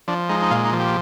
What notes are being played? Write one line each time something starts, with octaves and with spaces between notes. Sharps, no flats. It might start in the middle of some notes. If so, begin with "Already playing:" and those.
F3 D4
G#3 D#4
D#4
A#2 F4
D#4
F3
G4